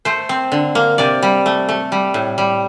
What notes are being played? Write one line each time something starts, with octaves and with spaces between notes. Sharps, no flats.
A3 C5
C4
D3
A#3
C3 D5
G3
A3
A3
G3
A2
G3